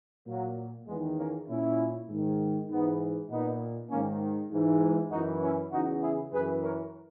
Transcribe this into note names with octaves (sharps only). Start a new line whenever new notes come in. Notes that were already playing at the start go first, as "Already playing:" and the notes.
A#2 F#3 A#3
E2 D#3 G#3 B3
A#3 C#4
A#2 C#4 E4
G#2 D#3
G#2 E3 B3 D#4
A#2 B3 D#4
G#2 D#3 A#3 C#4
G#2 E3
F#2 E3 D#4 F#4
C#4 E4
E2 C#3 E3 D#4 F#4
E4 G#4
F#2 G#4 B4
E3
A#4 C#5